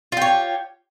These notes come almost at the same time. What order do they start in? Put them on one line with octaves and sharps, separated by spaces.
F4 G4 C#5